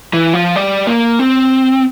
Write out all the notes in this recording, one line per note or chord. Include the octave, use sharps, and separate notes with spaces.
E3
F3
G3
A#3
C4